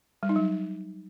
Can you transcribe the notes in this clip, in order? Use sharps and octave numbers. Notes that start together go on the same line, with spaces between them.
G3
D#4
F#3